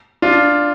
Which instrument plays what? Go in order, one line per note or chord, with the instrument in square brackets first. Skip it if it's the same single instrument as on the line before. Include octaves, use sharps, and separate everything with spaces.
[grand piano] D4 F4